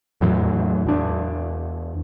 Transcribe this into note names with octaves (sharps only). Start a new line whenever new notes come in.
E2 A2 E3 F#3
E2 D4